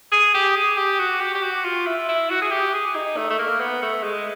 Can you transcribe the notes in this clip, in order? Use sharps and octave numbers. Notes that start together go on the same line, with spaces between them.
G#4
G4
G#4
G4
F#4
G4
G4
F#4
F4
E4
E4
F#4
G#4
G4
G#4
D#4
A3
A3
A#3
B3
A3
G#3